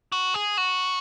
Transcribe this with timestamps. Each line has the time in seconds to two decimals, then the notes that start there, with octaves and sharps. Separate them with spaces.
0.12 F#4
0.34 G#4
0.58 F#4